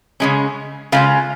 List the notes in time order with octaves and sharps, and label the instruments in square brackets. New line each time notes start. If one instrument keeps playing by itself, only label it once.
[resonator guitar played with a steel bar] C#3 G#3 C#4
C#3 G#3 C#4 F4 F5